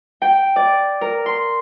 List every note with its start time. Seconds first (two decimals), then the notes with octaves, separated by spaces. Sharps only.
0.22 G5
0.56 D5
1.01 A#4
1.26 C6